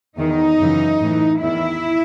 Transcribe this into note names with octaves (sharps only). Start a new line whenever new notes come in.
E2 D#3 D#4
F#2 C#3 E3
A2 E3
E2 D#3 E4